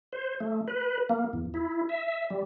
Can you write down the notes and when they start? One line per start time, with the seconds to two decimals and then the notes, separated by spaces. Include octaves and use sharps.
0.13 C5
0.40 A3
0.68 B4
1.09 A#3
1.33 E2
1.54 E4
1.89 E5
2.30 G3